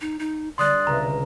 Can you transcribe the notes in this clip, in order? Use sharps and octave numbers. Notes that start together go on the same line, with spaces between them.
D#4
D#4
D3 G3 D5 C6 D#6 F#6
C#2 C3 A#5